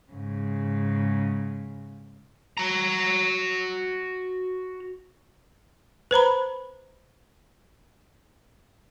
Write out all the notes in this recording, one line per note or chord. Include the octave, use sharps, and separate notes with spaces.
G#2 C#3
F#4 A#5
B4 C5 A#5 B5